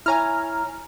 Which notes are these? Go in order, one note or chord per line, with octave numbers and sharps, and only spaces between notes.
E4 C#5 G#5 A#5 F6